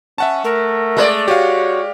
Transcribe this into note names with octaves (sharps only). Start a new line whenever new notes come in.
C#4 E5 F#5 A5
A3 A#4
G#3 B4 D5
F#4 G4 C#5 F5